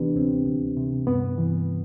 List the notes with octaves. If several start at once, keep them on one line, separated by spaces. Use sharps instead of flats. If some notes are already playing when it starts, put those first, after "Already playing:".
Already playing: D2 C3 E3 B3 D4 G4 B4
D2 C4
D2
C3
G2 B3
E3